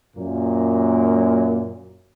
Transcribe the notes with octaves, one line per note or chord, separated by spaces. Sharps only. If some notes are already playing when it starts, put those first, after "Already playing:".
F#2 A#2 A#3